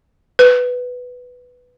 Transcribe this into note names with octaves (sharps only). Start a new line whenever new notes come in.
B4